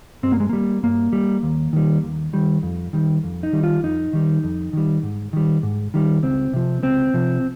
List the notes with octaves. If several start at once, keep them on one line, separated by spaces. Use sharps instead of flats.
G2 C4
A#3
G#3
G3 A#3
G2 A#3
G3
D#2
D#3 G3
D#2
D#3 G3
F2
D#3 G3
F2
D#4
D#3 G3
F4
F2 D#4
D#3 G3
F2
D#3 G3
G#2
D#3 G3
G#2
D#3 G3
C#2 C4
C3 F3
C#2 C4
C3 F3